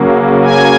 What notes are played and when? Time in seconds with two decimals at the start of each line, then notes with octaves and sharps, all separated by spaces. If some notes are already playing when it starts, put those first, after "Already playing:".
Already playing: C#3 F#3 A#3
0.42 G#5